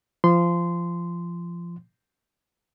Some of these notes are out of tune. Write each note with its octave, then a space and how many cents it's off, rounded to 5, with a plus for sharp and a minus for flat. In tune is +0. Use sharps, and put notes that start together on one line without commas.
F3 -20 C6 -15